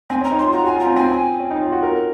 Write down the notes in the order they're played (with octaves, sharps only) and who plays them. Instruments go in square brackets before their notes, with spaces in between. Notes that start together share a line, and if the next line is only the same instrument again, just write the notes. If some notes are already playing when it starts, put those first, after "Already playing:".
[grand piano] C4 [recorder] G#5
[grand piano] C#4 [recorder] A#5
[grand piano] D#4
[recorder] C6
[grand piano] F4
[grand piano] F#4 [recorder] A#5
[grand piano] F#4 [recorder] G#5
[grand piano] F4 [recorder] A#5
[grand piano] C4
[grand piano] C4 [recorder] G#5
[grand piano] C#4
D#4
F4
F#4
A#4